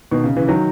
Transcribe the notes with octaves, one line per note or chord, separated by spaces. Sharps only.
B2 D#3
C#3
C#3 E3
D#3 F#3